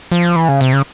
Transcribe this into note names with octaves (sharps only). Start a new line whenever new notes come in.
F3
E3
C#3
C3
C#3